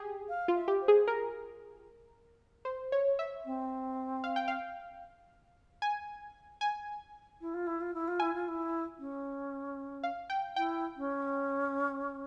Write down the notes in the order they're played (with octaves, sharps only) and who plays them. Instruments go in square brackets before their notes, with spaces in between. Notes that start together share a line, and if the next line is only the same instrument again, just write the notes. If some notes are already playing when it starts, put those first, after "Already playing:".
Already playing: [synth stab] G4 G#4
[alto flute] F5
[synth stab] F4
[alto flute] E5
[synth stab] G4
[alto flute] C5
[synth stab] G#4
A#4
C5
C#5
E5
[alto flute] C4
[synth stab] F5
G5
F5
G#5
G#5
[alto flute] E4
F4
E4
F4
E4
F4
[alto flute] E4 [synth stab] G#5
[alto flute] F4
E4
C#4
[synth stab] F5
G5
[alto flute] E4 [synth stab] G5
[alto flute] C#4